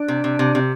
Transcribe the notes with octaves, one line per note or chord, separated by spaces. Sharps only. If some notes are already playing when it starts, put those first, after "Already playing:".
Already playing: D4
C3
C3
C3
C3